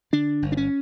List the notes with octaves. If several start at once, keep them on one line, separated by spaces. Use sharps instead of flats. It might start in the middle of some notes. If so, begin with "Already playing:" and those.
D3 D4
G1
D4
C#4